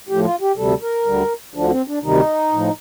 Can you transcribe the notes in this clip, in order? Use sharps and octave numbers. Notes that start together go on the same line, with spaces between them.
A2 F3 G4
F4
G4
D2 C3 G3 A4
A#4
D2 D3 G3
D2 D3 F3 D4
C4
D4
D2 C3 D#3 G3 D#4
A2 F3